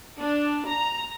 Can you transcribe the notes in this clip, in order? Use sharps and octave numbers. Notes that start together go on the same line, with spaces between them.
D4
A#5